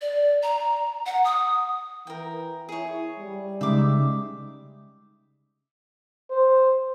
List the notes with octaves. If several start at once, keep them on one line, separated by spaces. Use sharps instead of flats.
D5
A#5
F#5
D#6
E3 A#4 G5
E4 G#4 C#5
G3
C#3 G#3 D#4 E5 D6
C5